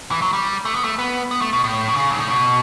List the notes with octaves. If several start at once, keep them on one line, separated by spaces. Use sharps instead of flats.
E3
F#3
G3
A3
B3
A3
B3
B3
A3
B2
A2
B2
C#3
G2
A2
B2